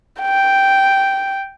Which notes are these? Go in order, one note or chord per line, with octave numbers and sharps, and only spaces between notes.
G5